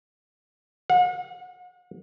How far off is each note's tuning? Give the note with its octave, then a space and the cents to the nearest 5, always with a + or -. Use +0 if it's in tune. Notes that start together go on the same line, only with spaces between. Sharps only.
F#5 -40